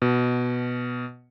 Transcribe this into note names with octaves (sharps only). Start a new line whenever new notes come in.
B2